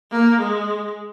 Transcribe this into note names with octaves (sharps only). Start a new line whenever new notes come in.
A#3
G#3